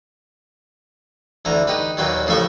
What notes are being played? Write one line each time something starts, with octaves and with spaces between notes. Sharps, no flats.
D2 D3 E3 A#5
D#4 G4 B4
D#2 A#2 F#3 B4 G5
A1 A2 C#3 F3 A4 E5